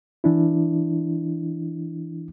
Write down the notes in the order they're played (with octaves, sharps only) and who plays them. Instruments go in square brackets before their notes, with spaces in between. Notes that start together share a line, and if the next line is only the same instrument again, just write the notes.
[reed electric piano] E3 D4 E4